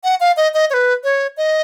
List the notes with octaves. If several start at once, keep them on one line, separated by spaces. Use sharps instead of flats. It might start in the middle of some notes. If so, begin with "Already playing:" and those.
F#5
F5
D#5
D#5
C#5
B4
C#5
D#5